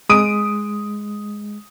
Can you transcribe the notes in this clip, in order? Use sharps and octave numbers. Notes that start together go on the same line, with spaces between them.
G#3 D#6 D7 D#7